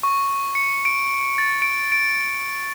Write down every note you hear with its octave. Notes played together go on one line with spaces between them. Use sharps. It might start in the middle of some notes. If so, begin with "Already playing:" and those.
C#6
C#7
D7
A6
D7
D7